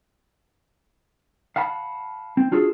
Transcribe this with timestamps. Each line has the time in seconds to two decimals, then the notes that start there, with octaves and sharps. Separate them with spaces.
1.56 F5 F#5 A5 B5
2.37 C4
2.52 D4 F4 F#4 G#4 A4